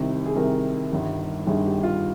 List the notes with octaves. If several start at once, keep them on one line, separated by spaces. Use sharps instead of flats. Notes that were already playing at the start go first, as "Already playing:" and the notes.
Already playing: C2 C3 D#3
G#4
C2 C3 D#3 A#4
G1 G2 D#3
G1 G2 D#3 G#4
G4
F4